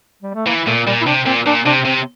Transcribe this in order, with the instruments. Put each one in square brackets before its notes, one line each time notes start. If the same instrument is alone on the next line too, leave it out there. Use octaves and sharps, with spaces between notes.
[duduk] G3
A3
[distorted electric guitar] E3 [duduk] A#3
[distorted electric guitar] A#2 [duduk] A3
[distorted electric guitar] A#2 [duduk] G3
[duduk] E4
[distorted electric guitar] C3 [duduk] D4
[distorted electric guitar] A#2 [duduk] C4
[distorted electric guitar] A#2 [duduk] D4
[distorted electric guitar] C3 [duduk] D4
[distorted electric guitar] C3 [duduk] C4